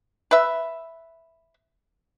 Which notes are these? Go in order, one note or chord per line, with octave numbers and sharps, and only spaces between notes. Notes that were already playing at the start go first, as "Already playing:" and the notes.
B4 E5